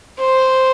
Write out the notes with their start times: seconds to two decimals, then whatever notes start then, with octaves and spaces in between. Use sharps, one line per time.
0.19 C5